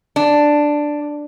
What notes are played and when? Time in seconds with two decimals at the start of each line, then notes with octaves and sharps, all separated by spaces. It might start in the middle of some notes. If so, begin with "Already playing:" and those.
0.16 D4